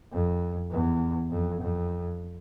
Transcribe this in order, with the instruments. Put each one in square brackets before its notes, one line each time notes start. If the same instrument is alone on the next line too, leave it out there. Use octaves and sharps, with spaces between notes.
[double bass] F2
E2
F2
F2